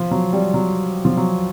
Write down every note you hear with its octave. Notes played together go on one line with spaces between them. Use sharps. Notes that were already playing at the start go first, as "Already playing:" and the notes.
Already playing: F3
F#3
G3
F#3
F3
F#3